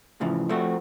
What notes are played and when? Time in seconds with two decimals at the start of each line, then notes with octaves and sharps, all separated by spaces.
0.21 A2 C#3 E3 F3
0.49 F3 A3 C4 F#4